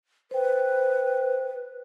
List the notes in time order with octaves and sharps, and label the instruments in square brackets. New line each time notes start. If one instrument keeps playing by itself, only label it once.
[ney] B4 [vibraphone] C5 G5